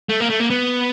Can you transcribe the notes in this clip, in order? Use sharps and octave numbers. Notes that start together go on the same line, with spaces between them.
A3
A#3
A3
A#3
B3